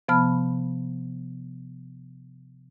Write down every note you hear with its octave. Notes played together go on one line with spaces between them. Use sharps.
C3 F3 B3 A5 B5 F6